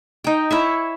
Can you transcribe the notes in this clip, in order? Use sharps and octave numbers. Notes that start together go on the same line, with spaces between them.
D#4 G5
E4 C#5 E5